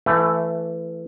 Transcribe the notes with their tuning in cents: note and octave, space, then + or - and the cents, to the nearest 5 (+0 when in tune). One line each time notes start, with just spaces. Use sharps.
E3 +20 A3 +0